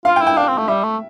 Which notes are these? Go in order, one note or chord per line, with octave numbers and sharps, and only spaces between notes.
F4 F5
G5
E4
G5
D4 F5
C4
A3
G3 E5
A3